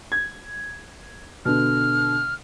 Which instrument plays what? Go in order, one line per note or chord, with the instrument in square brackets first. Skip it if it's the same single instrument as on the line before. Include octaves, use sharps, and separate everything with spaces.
[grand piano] G#6
[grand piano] B2 D3 [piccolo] F6